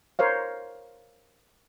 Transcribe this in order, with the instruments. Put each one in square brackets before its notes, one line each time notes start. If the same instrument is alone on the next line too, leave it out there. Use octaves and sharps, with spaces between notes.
[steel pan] A#4 C5 C#5 F5